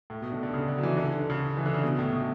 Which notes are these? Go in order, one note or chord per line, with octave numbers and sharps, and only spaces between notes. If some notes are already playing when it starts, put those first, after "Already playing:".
A2
B2
D3
D3
C#3
D3
F#3
E3
D3
D3
D3
C#3
E3
D3
C#3
B2
A2
B2